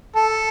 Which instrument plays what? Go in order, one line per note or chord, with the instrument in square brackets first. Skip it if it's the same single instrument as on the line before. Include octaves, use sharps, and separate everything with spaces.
[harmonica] A4